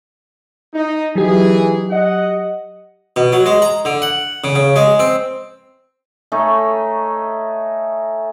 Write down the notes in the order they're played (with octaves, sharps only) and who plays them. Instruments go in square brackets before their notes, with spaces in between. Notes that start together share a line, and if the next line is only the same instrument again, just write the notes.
[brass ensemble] D#4
[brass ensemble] E3 D#4 G#4 [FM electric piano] F#3 G4
[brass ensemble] D#5 F#5
[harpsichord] B2
F#3
G#3
A#5
D3
F#5
C#3
C#3
G#3
C4
[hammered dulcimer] A3 C#4 D#4